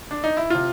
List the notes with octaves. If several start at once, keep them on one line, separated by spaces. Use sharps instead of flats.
D4
D#4
E4
C3 F4